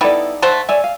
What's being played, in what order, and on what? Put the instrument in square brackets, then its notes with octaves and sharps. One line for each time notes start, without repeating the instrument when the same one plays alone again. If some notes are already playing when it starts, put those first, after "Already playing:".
[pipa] G3 B3 E4 [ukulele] D#4 A4 D5
[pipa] A3 C5 F#5
[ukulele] C#5 D5 G#5 [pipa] E5
[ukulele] F5